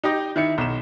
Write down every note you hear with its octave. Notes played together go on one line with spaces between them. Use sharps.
D#4 G4 D#5
D#3 E4 C#7
B1 E7